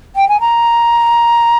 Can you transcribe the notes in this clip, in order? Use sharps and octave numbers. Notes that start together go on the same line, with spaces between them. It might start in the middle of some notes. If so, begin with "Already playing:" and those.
G5
G#5
A#5